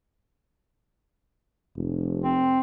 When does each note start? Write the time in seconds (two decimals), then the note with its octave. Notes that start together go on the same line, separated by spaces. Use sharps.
1.76 F1
2.24 C4